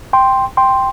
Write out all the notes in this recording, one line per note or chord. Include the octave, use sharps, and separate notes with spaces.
G5 C6
G5 C6